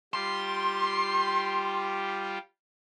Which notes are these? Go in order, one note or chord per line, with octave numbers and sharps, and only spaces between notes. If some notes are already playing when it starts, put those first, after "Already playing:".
G3 F4 G4 C6